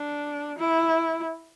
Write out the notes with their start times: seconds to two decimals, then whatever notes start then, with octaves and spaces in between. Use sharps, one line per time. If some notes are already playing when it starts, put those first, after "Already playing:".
Already playing: D4
0.59 E4